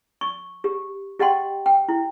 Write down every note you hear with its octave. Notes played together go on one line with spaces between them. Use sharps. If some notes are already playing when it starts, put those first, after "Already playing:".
C#6
G4
G4 D#5 F#5 G5 C6
G5
E4